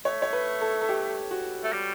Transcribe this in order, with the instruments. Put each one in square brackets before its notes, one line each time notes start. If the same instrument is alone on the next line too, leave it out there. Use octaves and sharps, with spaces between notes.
[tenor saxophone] A3 [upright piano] C#5
[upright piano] C#5
B4
A4
A4
G4
F#4
[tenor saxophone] A3
G3